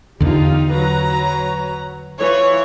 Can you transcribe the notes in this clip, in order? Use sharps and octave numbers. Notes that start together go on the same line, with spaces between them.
E2 D3 D#4 F4 G4
F#3 B4 A#5
E3 F4 C#5